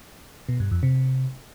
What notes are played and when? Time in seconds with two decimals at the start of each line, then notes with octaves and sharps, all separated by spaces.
0.49 B2
0.60 G2
0.71 F2
0.83 C3